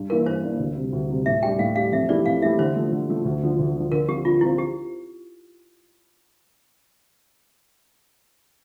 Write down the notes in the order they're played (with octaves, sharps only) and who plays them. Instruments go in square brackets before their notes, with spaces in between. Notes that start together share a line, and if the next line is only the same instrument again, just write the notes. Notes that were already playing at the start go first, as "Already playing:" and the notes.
Already playing: [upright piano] G2
[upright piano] E3 A#3 D4 [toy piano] A#4
[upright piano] G2 [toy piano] C5
[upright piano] E3 A#3 D4
D2
C3 G3
D2
C3 G3
[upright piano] A2 [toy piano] E5
[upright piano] G3 D4 G4 [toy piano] G5
[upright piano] A2 [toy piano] F5
[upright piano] G3 D4 G4 [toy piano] F5
[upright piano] F2 [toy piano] E5
[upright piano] E3 A3 E4 G4 [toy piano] D5
[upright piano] F2 [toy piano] F5
[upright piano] E3 A3 E4 G4 [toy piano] E5
[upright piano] D3 [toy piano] C5
[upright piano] F3 A3
D3
F3 A3
D2
D3 F3
D2
D3 F3
[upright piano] D3 [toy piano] A#4
[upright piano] F3 C4 F4 [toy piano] G4
[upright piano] D3 [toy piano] F4
[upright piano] F3 C4 F4 [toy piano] E4
[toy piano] G4